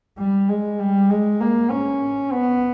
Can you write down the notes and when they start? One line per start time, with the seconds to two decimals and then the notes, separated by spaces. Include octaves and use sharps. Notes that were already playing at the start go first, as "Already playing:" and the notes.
0.19 G3
0.49 G#3
0.79 G3
1.10 G#3
1.41 A#3
1.71 C#4
2.32 B3